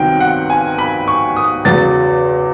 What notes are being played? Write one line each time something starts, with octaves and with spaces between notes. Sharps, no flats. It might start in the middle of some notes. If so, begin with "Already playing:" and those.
Already playing: C2 C3 D#3 F#3 B3 G5
F#5
G#5
B5
C#6
D#6
E2 C#3 F#3 A6